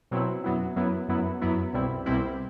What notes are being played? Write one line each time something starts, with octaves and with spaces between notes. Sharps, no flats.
B2 F#3 C4 E4
F#2 F#3 B3 E4
F#2 F#3 B3 E4
F#2 F#3 B3 E4
F#2 F#3 B3 E4
C2 B2 G3 C4 E4
C2 B2 G3 C4 E4